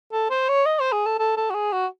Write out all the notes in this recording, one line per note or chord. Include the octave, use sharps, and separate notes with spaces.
A4
C5
C#5
D#5
C5
G#4
A4
A4
A4
F#4
G#4
F#4